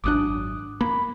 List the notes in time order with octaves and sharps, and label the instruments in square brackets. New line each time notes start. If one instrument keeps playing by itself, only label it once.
[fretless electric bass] G#1 F#2 D4 [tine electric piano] D6 D#6 F#6
[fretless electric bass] A#3 [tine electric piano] B5